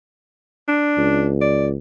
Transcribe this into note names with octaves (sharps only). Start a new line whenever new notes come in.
D4
C#2
D5